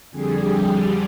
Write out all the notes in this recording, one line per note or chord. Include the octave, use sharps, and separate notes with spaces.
F2 D3 G3 G#4
G4
G#4